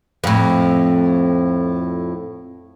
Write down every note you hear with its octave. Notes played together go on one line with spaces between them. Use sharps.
F2 A2